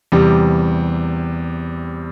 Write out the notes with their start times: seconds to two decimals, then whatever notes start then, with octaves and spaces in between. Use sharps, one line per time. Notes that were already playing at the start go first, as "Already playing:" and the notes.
0.12 E2 C3 G3